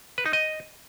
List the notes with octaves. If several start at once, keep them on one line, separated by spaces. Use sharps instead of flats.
B4
D#4
D#5